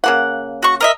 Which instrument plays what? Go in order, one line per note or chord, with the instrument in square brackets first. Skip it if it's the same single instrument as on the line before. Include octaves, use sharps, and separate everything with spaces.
[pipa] C#3 A#3 F#5
[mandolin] F#4 C#6
A#4 D#5 E5